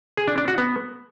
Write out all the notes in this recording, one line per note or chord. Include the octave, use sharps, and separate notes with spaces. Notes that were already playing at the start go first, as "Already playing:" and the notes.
G#4
D4
D4
F#4
B3